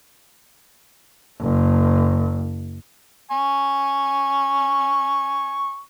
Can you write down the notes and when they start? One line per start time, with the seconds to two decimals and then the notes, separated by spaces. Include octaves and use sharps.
1.40 F#1
3.31 G#5 C#6